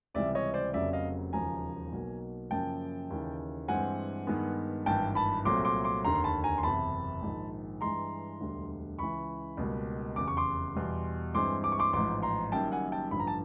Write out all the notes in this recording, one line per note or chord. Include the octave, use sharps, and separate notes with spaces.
C#2 C3 E3 G3 D5 E5
C#5 D#5
C5 D5
F1 F2 C#3 F#3 A#3 D5 E5
D#5 F5
E1 D#2 C#3 F3 G#5 A#5
B1 B2 F#3 A#3
F#2 C#3 F3 A#3 G5 A5
D#2 C#3 E3
G2 E3 G#3 C4 F#5 G#5
G2 D#3 G#3 B3
G#1 G2 E3 G5 A5
A5 B5
C2 A#2 F#3 A3 C4 C6 D6
C6 D6
C6 D6
F1 D#2 D3 A#5 C6
C6
A5 B5
G#5 A#5
C6
F#1 E2 C3 A5 B5
A#1 G#2 D#3 G#3
G2 E3 G#3 A#5 C6
E1 D2 D3 G3
C#2 C#3 E3 B5 C#6
C#2 B2 G3 A#3
F1 E2 C#3 D6
C#6
C6 D6
E2 B2 G3
G2 E3 G#3 C4 C6 D6
D6
C#6
C6 D6
A1 G#2 F3 C6 D6
A#5 C6
F#1 F#2 D#3 G3 A#3 G5 A5
F#5 G#5
G5 A5
A1 G2 D3 F3 B5
A#5
A5